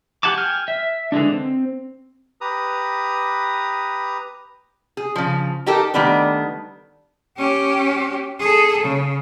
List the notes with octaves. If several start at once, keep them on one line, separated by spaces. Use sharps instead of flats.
G4 F#5 G#5 A5 D6
G5 G#5 F6
E5
D3 E3 G#3 D4
C4
G4 B4 A#5 D#6
G#4
C#3 F3
D#4 G4 A4 A#4
D#3 G3 A3 B3 D4
C#4 G4
G#4 A4
C#3